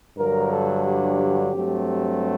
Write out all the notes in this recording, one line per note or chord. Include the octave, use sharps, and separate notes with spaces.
G2 D3 F#3 A#4
A4
G4
G2 F#3 A3 C4